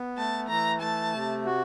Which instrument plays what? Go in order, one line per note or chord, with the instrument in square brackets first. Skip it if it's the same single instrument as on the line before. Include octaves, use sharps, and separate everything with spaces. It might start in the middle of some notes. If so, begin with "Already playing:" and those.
Already playing: [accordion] B3
[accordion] A3 [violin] A5
[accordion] E3 [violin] A#5
[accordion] A3 [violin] A5
[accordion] C3
F#4